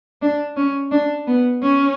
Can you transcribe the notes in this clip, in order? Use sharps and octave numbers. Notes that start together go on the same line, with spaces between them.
D4
C#4
D4
B3
C#4